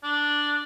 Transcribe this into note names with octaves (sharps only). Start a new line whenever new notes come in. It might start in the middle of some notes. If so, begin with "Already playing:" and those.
D4